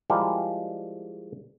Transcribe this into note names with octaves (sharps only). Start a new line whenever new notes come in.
F3 G3 G#3 E4 G4 A#4